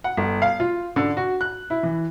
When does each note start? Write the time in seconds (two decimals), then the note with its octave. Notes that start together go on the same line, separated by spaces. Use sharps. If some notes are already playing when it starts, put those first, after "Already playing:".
0.04 F#5
0.17 G1
0.42 F5
0.60 F4
0.96 D3
1.17 F#4
1.41 F#6
1.70 E4
1.83 E3